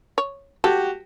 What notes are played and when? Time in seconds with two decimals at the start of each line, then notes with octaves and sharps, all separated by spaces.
0.18 C#5
0.64 F#4 G4 A4